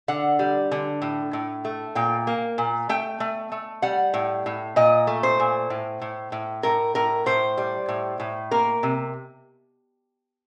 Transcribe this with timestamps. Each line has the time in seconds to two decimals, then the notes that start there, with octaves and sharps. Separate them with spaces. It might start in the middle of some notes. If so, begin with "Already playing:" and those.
0.08 D3 F#5
0.39 G3
0.72 D3
1.02 A2
1.33 A2
1.65 A3
1.95 A#2 G5
2.27 A#3
2.58 A#2
2.89 A3 G5
3.20 A3
3.52 A3
3.82 G3 F#5
4.14 A2
4.46 A2
4.76 A#2 D#5
5.07 A3
5.23 C5
5.40 A#2
5.70 A2
6.02 A2
6.32 A2
6.63 A2 A#4
6.95 A2 A#4
7.26 A2 C5
7.58 G3
7.89 A2
8.20 A2
8.51 A#3 A#4
8.83 C3